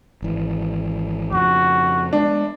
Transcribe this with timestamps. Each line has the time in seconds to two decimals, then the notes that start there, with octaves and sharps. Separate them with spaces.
0.22 G#1 E3
1.32 F2 C#3 F3 F#4
2.13 G#3 B3 D4